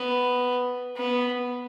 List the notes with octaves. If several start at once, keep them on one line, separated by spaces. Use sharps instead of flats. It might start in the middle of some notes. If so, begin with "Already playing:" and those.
Already playing: B3
B3